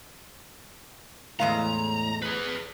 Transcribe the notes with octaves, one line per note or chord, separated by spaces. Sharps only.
E2 A2 G#3 F5 A#5
G#4 B4